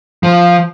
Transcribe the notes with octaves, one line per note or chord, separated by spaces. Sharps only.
F3